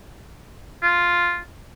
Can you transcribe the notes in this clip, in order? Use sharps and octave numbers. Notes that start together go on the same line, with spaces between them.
F4